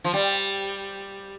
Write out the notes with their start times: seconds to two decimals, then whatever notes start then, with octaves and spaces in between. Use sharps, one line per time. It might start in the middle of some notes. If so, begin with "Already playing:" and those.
0.04 F3
0.14 G3